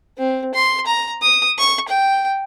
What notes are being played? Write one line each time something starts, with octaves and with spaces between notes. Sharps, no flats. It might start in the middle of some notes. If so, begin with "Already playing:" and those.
C4
C6
A#5
D#6
C#6
G5